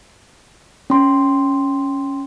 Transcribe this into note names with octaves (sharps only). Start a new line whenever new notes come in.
C#4 C6